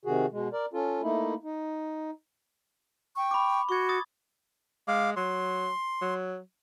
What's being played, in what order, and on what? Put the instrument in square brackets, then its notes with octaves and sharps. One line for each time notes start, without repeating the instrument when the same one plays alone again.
[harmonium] C3 D#3 F#4 G#4
B2 G#3
A#4 D5
C#4 F4 A4
A3 A#3 D#4 E4
D#4
[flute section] G5 C#6
[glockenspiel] B5 D6
[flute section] F#4 [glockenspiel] C#6 G#6
[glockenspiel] D#6 A6
[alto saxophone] G#3 [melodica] F5 D6
[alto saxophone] F#3 [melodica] C6
[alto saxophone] F#3